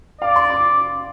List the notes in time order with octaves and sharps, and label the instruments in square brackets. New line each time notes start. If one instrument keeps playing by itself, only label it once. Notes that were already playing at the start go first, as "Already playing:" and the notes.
[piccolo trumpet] D5 [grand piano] F5
[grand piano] C6
D6